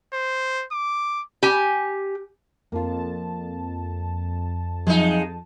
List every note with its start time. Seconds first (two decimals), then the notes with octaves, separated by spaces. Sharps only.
0.13 C5
0.72 D6
1.43 G4 G#5
2.72 F2 A#3 F4 A5
4.87 F3 F#3 G#3 D#4 F4